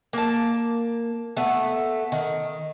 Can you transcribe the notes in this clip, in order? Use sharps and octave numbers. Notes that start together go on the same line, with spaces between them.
A#3 A5
A3 B3
D#3